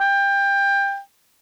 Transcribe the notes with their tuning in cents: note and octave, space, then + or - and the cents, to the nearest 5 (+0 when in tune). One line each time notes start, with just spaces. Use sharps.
G5 +20